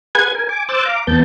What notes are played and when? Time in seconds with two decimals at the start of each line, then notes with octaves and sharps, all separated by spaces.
0.15 G#4 B4 F#5 G#5 G#6
0.35 A#4 G#5
0.49 G#5 D6
0.69 C5 D6 E6 F#6 G6 A6
0.85 F5 A#5 D6
1.07 E2 B3 A5 G6